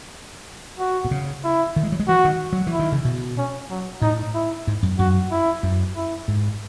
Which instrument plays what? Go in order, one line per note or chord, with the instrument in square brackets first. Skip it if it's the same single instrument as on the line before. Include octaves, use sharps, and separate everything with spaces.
[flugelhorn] F#4
[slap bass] B2
C#3
[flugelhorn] E4
[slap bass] D#3
G#3
F#3
G#3
[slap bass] E3 [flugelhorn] F#4
[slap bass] D#3
F#3
E3
[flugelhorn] E4
[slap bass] D#3
C#3
B2
[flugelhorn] C#4
F#3
[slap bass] A2 [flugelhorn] D#4
[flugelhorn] E4
[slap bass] G#2
F#2
[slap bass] F#2 [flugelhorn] F#4
[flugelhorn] E4
[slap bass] F#2
[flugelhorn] E4
[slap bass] G#2